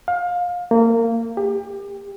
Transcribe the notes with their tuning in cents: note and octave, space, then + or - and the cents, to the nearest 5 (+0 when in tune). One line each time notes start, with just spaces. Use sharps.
F5 +25
A#3 -25
G4 +30